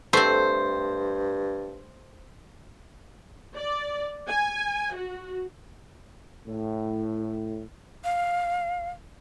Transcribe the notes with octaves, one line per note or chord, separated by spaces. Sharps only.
G2 A3 C4 C5
D5
G#5
F#4
A2
F5